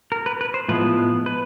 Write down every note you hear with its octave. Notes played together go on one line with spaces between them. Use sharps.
A#4
B4
B4
C5
A2 F3 G#3 B3 B4
B4